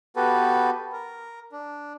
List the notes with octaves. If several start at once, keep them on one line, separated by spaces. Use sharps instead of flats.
B3 F#4 G4 A4 B4
A#4
D4